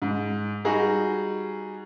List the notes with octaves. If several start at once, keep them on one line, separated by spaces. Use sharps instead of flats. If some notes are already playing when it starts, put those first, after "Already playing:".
G#2
G3 D#4 F#4 G#4